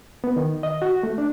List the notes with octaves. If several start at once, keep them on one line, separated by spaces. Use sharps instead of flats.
B3
D#3
D#5
F#4
A3
D4